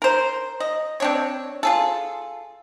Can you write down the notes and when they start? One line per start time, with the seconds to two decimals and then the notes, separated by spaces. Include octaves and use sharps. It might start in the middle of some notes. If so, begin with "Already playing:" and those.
0.02 A#4 C5
0.60 D#5
1.00 C4 D4 C#5
1.63 F4 G#4 A4